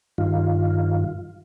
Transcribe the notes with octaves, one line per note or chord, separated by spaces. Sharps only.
G2 D#3 F4